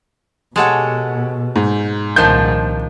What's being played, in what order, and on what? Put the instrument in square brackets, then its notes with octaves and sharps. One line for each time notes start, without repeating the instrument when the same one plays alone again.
[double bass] B2 [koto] G#3 A4 C#5 [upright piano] G4 F#5
[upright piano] G#2
[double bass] C2 A#2 [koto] D#3 F3 D4 [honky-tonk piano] G6